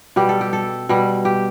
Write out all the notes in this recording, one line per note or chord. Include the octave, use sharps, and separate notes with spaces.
B2 G3 G4
A4
G4
A4
B2 G3
G4